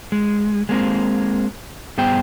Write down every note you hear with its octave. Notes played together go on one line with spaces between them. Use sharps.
G#3
G#3 A#3 C4
G2 B3 G#4 C5 G5